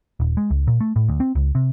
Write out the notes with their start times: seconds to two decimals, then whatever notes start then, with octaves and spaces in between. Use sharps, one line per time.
0.20 D#1
0.37 G#3
0.51 C#2
0.67 A#2
0.80 A3
0.96 A2
1.09 D2
1.20 C4
1.35 C#2
1.55 C3